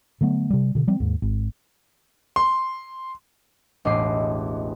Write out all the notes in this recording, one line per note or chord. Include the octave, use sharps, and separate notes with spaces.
D3 F#3 A3 B3
C3 G3
B2 D3
F3 G3 C4
D#2 G#2
G#1
C6
E1 A1 D#5 D6 C7